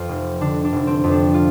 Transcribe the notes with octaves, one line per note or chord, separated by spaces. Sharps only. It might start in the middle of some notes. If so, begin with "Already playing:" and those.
Already playing: F2 F4
F1
D3 D4
D4
F1
C4
F2
D4
F4